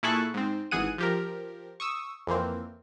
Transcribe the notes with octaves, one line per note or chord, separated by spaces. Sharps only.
A#2 E4 G#4 A4 C#6 F#6
G#2 C4
G#1 E3 G#4 F#5 D#7
F3 G4 A#4
C#6 D#6 E6
F2 E3 A#3 C4